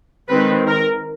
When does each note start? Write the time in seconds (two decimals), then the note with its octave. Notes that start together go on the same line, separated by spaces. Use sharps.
0.29 D#3 G#3 C4 B4
0.67 A#4